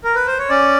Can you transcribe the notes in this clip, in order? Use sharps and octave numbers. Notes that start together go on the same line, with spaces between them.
A#4
B4
C5
C#5
C#4 D5